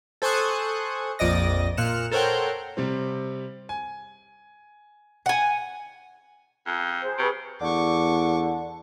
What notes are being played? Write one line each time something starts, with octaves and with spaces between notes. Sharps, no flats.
A4 C5 G#5 C#6 D#6 F#6
A#1 F2 D5 D#5 A#6
A#2 F6 F#6 C#7 E7
A4 A#4 C5 C#5 F#5 G5
C3 G3 C4
G#5
F#5 G#5
F2
G#4 C5
C3 G#4 B4 C#6
E2 D3 C#6 D6